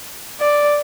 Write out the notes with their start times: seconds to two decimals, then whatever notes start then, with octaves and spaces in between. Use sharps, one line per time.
0.40 D5